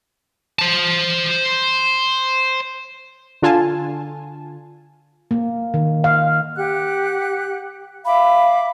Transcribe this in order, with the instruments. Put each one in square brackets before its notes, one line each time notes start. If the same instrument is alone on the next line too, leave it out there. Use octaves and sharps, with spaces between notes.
[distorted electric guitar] C5 A5
[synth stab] D3 F4 G#5 A5
[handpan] A#3
D#3
F5
[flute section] G4 F#5 F#6
[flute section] E5 D6 [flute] F5 [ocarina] B5